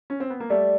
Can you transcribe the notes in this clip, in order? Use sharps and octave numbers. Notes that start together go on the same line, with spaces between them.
C#4
C4
B3
A#3
G3 A3 D5